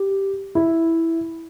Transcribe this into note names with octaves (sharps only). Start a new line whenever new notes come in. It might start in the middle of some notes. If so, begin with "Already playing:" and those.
Already playing: G4
E4